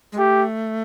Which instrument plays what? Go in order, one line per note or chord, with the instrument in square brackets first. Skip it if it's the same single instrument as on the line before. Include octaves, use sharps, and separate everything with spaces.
[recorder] G#3
[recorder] A3 [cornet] G4